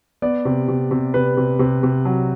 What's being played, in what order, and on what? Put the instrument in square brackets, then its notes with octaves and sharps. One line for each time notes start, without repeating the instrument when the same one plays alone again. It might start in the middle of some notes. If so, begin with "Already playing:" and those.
[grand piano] B3 D5
C3
C3
C3
C3 B4
C3
C3
C3
F#3